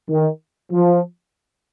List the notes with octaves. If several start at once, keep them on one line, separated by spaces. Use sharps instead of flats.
D#3
F3